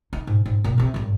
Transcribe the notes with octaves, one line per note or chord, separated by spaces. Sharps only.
D#4
G#2
G#2
A#2 A#3
C2 C3
G#1 G2